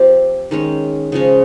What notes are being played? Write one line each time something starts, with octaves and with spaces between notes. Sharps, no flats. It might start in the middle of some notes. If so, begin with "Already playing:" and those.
Already playing: F3 C4 G4
D#3 G#3 C#4
C#3 F3 G#3 C#4